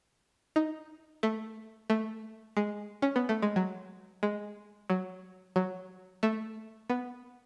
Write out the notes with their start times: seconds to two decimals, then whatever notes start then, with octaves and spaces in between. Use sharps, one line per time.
0.56 D#4
1.23 A3
1.90 A3
2.57 G#3
3.02 C#4
3.16 B3
3.29 A3
3.42 G#3
3.56 F#3
4.23 G#3
4.90 F#3
5.56 F#3
6.23 A3
6.90 B3